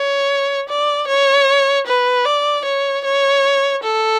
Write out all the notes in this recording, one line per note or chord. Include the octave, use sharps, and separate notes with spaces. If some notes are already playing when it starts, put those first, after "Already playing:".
Already playing: C#5
D5
C#5
B4
D5
C#5
C#5
A4